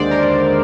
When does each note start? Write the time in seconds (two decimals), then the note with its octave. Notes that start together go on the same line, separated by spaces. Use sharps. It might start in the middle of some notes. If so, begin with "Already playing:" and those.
Already playing: D#2 D3 G#3 C5 D5
0.11 A#4